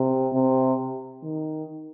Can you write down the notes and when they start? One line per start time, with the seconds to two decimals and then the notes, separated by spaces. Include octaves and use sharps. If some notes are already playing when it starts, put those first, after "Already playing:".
Already playing: C3
0.33 C3
1.23 D#3